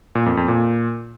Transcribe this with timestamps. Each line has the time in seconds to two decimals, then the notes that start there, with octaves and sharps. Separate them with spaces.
0.15 A#2
0.26 F2
0.37 F2
0.48 A#2